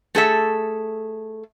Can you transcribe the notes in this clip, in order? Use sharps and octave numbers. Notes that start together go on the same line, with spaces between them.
A3 G#4 A4 E5